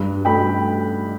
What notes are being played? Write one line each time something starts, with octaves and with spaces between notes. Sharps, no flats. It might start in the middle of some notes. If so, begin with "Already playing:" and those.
Already playing: G2
A3 G5 B5